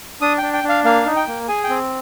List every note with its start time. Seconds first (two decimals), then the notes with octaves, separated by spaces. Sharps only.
0.21 D4 D#6
0.38 D4 G5
0.53 G5
0.64 D4
0.69 F5
0.85 A#3 F5
1.06 D#4
1.16 G5
1.28 A#3
1.48 G#4 G#5
1.64 G5
1.69 C4